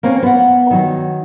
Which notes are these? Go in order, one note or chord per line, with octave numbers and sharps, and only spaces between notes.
A#3 C4 C#4
B3 F#5
D#3 F#3